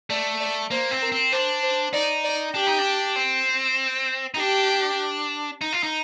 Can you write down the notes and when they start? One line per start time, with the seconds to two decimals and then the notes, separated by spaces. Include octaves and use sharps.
0.10 A3 D5
0.40 D5
0.71 A#3 C5
0.91 C4
1.02 A#4
1.12 C4
1.32 D4 C5
1.63 C5
1.93 D#4 D5
2.24 D5
2.55 D4 G4
2.67 D#4
2.79 D4
3.16 C4
4.34 D#4
4.39 D4 G4
5.61 D#4
5.73 F4
5.83 D#4